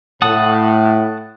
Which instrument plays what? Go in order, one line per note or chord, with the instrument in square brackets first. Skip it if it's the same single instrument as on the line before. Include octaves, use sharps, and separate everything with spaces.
[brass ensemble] A2 [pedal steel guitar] F#5 A5 D#6